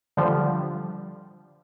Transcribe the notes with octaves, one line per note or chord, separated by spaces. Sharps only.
D3 F3 G3